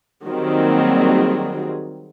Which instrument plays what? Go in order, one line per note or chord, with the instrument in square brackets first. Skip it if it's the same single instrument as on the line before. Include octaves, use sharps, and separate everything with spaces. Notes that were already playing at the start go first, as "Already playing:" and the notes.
[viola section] D#3 F#3 G3 A#3 C4 G#4